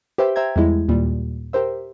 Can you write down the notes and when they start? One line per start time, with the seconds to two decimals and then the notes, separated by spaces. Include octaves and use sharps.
0.18 G4 B4 C5 E5 G5
0.36 C5 E5 G5 A#5 G#6
0.56 E2 G3 G#3 E4
0.89 D#2 A#2 G3
1.53 G4 A#4 C5 E5